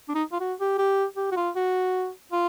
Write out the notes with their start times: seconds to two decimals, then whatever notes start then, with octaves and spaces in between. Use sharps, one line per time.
0.08 D4
0.14 D#4
0.32 F4
0.40 F#4
0.60 G4
0.78 G4
1.16 G4
1.31 F#4
1.36 F4
1.56 F#4
2.32 F4